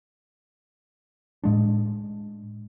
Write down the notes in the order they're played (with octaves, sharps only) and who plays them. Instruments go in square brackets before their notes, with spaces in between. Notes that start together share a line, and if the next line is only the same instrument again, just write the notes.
[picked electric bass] A2 G#3 D4